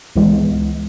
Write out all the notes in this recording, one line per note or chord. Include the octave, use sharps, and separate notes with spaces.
C#2 A2 E3 G#3 B3